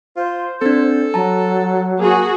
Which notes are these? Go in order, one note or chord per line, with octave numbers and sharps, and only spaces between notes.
F4 C5
C4 D4 A4
F#3 A5 A#5
A#3 F#4 G#4